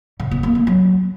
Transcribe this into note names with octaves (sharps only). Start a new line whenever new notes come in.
C#3
B3
A#3
A3
F#3